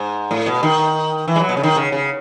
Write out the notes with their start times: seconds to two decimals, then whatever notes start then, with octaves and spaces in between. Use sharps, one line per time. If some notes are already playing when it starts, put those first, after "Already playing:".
Already playing: G#2
0.31 A2
0.46 B2
0.63 D#3
1.28 E3
1.36 G#3
1.40 F#3
1.49 B2
1.57 C#3
1.63 D#3
1.76 C#3
1.92 C#3